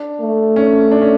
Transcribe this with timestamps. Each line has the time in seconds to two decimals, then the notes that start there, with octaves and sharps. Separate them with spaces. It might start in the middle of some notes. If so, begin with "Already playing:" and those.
Already playing: D4
0.21 A3
0.56 C#4
0.91 D4
1.02 C#4